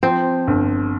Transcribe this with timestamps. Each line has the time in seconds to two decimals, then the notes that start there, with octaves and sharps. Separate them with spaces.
0.03 F3 C4
0.47 G1